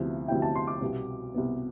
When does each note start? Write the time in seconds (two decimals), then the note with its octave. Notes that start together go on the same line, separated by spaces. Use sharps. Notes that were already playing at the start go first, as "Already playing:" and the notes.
Already playing: D2 C3 F3 B3 E4
0.28 D2 C3 F3 B3 E4 G5
0.42 A5
0.56 C6
0.67 D6
0.81 C2 B2 G3 B3
1.34 C2 B2 G3 B3